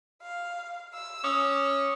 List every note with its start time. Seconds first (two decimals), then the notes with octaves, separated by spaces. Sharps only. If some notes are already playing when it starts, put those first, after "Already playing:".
0.22 F5
0.94 E6
1.24 C#4 D6 D#6